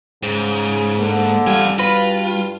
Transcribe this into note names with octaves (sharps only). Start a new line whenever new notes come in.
G#2 C#3
D3 A#3
E2 G3 F4 G#5
G2 F4 F#4 B4 B5